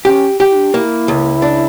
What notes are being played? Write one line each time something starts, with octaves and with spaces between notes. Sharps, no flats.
C#4 G4
G4
E4
D4
A#3 E4
C#2
D4